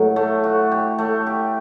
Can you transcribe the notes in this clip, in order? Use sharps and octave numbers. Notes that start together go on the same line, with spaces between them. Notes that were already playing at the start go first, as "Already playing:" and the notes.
Already playing: A2 F#3
A3
F#4
G4
A3
G4